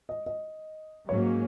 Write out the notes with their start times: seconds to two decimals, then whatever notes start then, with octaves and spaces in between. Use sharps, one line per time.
0.09 D#5
0.26 D#5
1.08 G#2 F#3 A#3 C#4 C#5